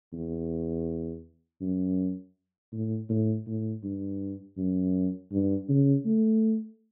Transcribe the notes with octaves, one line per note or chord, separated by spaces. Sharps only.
E2
F#2
A2
A2
A2
G2
F#2
G2
C#3
A3